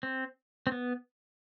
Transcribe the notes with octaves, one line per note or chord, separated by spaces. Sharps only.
C4
C4
B3